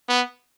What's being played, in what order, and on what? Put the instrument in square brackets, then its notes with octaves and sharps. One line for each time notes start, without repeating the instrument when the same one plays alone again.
[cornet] B3